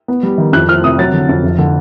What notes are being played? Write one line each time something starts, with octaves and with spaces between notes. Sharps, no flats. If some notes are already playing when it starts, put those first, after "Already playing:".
B3
G3
D#3
F2 F#6
F3 F6
C3 D#6
F#3 A6
D3
F2
F1
D3